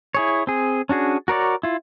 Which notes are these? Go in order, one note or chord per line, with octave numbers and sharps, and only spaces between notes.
E4 G#4 C#5
C4 G#4
C#4 D4 F#4 G#4
F#4 A#4 C#5 D5
E4 F4